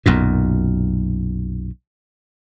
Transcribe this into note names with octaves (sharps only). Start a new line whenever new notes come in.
B1 F#2 A#2